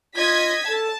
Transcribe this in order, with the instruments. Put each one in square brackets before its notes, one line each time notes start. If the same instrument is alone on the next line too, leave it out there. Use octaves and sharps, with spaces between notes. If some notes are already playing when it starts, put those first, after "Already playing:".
[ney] F4 [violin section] D#5 G#6 B6
[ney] A4 [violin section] A5